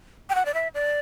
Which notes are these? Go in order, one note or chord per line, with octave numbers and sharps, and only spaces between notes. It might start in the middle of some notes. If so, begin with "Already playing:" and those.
G5
F#5
D5
E5
D5